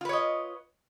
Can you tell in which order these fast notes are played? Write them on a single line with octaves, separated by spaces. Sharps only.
F4 B4 C#5 D#5